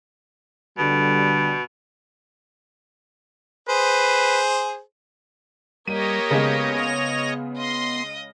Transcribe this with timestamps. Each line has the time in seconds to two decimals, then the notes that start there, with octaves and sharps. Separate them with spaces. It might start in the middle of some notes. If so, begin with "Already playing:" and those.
0.78 B2 D3 G3
3.69 G#4 B4 C5
5.88 G3 A#3 G4 C#5 D#5 D#7
6.31 C#3 G#3 B3
6.79 F7
7.57 D#5 C6